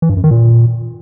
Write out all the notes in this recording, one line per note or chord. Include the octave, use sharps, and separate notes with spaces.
E3
G2
F#2
D#3
A#2